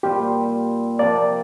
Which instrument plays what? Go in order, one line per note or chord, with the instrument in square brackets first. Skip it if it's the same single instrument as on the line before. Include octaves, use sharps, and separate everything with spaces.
[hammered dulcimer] A#2 G3 C4 F4 [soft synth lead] G4
[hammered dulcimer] C3 F3 A#3 [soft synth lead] D5